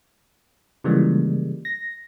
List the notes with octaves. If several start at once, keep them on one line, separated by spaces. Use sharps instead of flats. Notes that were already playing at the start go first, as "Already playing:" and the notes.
C#3 E3 F3 G3 G#3 A#3
A#6